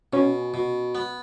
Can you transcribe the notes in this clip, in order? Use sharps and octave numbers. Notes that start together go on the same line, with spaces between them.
B2 C#4
B2
B3